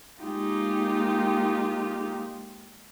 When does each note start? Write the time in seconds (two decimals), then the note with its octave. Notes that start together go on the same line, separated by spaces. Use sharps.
0.21 G#3 A#3 D#4 F4 G4